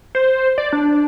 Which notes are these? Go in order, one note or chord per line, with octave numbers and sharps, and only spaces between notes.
C5
D5
D4